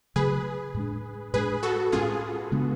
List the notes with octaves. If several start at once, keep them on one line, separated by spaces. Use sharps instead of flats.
C#3 F#3 A3 G#4 B4
A2 G#3 D4
A2 G#3 D4 G#4 B4
F#4 A4
A2 G#3 C#4 F4 G#4
C#3 G#3 B3 D4